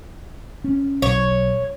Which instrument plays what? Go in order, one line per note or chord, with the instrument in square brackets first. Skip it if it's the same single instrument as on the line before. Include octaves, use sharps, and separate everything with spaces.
[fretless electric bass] C#4
[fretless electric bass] B1 [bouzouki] C#5